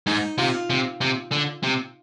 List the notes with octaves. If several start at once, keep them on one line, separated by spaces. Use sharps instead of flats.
G#2 D#4
C3 F4
C3
C3
D3
C3